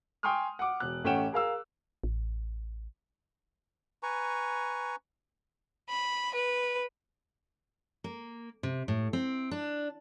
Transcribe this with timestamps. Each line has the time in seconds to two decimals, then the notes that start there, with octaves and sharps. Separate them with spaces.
0.23 G5 G#5 C6 C#6 D#6 F6
0.59 F#5 D6
0.80 E1 F#6
1.04 A1 A3 C#4 F#5 G5 E7
1.32 G#4 A#4 F5 E6
2.04 A1
4.03 B4 G#5 A#5 C#6
5.88 B5
6.34 B4
8.04 A#3
8.63 C3
8.88 A2
9.13 C4
9.51 D4